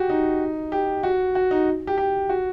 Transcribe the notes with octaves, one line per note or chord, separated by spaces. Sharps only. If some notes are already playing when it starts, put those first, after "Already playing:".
Already playing: F#4 G4
D#4
G4
F#4
F#4
D#4
G4
G4
F#4